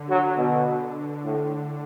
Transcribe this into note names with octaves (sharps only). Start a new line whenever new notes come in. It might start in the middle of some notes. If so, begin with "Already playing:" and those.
Already playing: D3
F#3
B2
A2